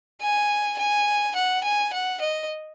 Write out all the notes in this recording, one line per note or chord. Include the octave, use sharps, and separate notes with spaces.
G#5
G#5
F#5
G#5
F#5
D#5